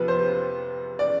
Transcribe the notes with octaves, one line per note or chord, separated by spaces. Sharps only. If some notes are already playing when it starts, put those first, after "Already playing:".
Already playing: F2 C3 F3 B3 B4
C5
D5